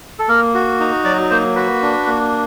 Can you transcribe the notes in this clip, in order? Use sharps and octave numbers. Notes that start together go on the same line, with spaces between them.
A4
A#3 A#4
F#4
D#4
F#3 D5
A#3 C5
F#4 B4
D4
A#3